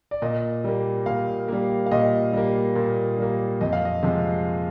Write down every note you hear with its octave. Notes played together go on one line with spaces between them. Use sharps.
D5
A#2 D#5
G3 A#3
A#2 F5
G3 A#3
F5
A#2 D#5
G3 A#3
A#2
G3 A#3
F2 D#5
F5
D#5
C3 F3 G#3